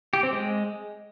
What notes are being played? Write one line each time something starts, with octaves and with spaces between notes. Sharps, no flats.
G4
C4
G#3